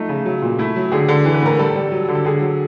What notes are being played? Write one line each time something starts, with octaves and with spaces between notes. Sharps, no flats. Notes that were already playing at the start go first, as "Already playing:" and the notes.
Already playing: F3 A3 D#4
C#3
F#3
A#2
A3 E4
F#3
D3 G#4
D3
E3
B4
A2 A#4
G3 A4
G3
F#3
D3
A4
D3 G#4
F#3